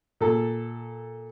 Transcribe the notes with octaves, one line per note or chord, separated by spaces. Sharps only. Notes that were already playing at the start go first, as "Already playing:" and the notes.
A#2 A4